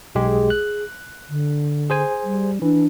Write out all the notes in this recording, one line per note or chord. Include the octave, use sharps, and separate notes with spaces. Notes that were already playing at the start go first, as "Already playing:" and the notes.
B1 G#3 G4 G#4
F#6
D3
G#4 C5 G#5
G3
E3 D4